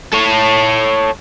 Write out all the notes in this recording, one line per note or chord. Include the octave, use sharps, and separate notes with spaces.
A4 C#5